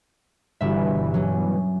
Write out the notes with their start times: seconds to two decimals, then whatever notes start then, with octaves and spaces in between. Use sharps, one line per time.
0.61 G1 G2 B2 E3 E5
1.14 F#3 C#4